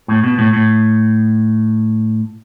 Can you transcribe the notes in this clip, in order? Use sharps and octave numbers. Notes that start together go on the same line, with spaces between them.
A2
B2
A2
A2